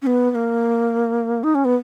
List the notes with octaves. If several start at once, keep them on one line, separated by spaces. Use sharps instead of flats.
C#4
B3
B3
A#3
D#4
C#4
B3